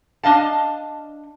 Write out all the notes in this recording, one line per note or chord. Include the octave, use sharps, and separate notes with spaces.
D4 D#5 F5 A5